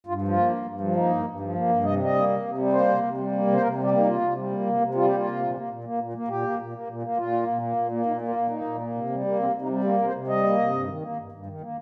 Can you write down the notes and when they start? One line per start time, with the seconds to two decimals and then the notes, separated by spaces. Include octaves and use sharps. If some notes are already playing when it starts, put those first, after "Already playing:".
0.07 G2 F4
0.22 F3
0.28 F4
0.36 A#3
0.51 G2
0.66 G2
0.81 F3
0.95 A#3 D#4
1.10 G2
1.25 G2
1.40 F3
1.55 A#3
1.69 G2
1.84 C3 D#5
1.99 G3 D#5
2.14 A#3
2.29 C3
2.43 C3
2.58 G3
2.73 A#3 C5
2.88 C3
3.03 C3
3.17 G3
3.32 A#3
3.47 C3
3.53 C5
3.62 C3 A#4
3.77 G3
3.83 G4
3.92 A#3
3.98 D#4
4.06 C3 F4
4.21 C3
4.36 G3
4.51 A#3
4.66 C3
4.81 C3
4.94 G3 F4
5.05 A#3 G4
5.17 F4
5.24 C3
5.40 A#2
5.54 A#3
5.69 A#2
5.84 A#3
5.98 A#2
6.14 A#3
6.28 A#2 G4
6.43 A#3
6.58 A#2
6.73 A#3
6.87 A#2
7.03 A#3
7.17 A#2 F4
7.33 A#3
7.47 A#2
7.62 A#3
7.76 A#2
7.91 A#3
8.06 A#2 D#4
8.21 A#3
8.28 F4
8.36 A#2
8.50 A#3 D#4
8.65 A#2
8.81 A#3
8.94 C3
9.10 G3
9.24 A#3
9.39 C3 C4
9.54 C3
9.61 D#4
9.68 G3
9.84 A#3 C4
9.98 C3 A#4
10.06 C5
10.14 C3
10.28 G3 D#5
10.43 A#3
10.57 C3
10.73 G2
10.87 D#3
11.01 A#3
11.17 G2
11.32 G2
11.46 D#3
11.61 A#3